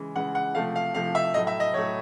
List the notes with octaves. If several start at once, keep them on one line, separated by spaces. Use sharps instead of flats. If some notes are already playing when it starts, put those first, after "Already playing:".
Already playing: C#3 E3 G#3
C#3 E3 G#3 F#5
F#5
C3 F3 A3 F5
F5
C3 F3 A3 F5
E5
A2 F#3 A3 D#5
E5
D#5
A2 F#3 A3 C#5